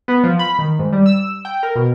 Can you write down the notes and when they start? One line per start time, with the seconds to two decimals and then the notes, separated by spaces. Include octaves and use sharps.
0.08 B3
0.24 F3
0.39 B5
0.59 D#3
0.79 G#2
0.93 G3
1.06 E6
1.45 G5
1.63 A#4
1.75 B2